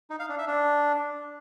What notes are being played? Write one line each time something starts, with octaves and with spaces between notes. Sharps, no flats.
D#4
F5
D4
E5
D4